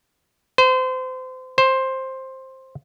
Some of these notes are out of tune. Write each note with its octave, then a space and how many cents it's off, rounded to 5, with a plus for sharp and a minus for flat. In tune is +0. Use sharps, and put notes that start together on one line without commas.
C5 -30
C5 +10